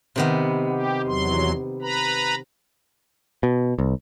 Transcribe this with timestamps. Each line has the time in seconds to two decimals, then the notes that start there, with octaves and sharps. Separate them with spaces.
0.16 C3 D#3 B3
0.72 G4
1.07 E2 F#3 C6
1.82 B4 A#5 B5
3.43 B2
3.79 C2